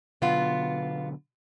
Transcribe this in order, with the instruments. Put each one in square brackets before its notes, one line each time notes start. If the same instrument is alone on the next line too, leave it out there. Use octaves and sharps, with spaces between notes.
[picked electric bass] B2 D3 F#3 [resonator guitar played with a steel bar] B3 F4